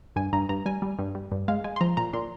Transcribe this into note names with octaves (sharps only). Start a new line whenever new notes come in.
G2 G#5
G2 A#5
G2 A#5
G3 G#5
G3
G2
G3
G2
G#3 F5
G#3 G#5
C6
F3 A#5
A#2 A#5
A#2 C6